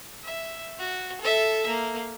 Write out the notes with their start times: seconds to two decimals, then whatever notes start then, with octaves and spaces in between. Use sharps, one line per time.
0.24 E5
0.79 F#4
1.21 A4 E5
1.67 A#3